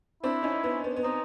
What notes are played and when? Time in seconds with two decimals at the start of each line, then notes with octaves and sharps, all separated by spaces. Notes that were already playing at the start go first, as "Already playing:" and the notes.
0.23 C4 D4 E4
0.43 C#4 D#4
0.64 B3
0.84 B3
0.96 B3
1.03 C4 D#4